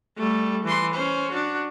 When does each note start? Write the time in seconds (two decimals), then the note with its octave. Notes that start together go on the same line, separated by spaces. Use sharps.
0.18 G3 A3
0.65 E3 C6
0.94 C#4 C5
1.31 D4 F#4